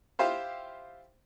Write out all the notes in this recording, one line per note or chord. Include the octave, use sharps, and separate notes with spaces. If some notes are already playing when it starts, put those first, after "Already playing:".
E4 F4 G4 C5 F5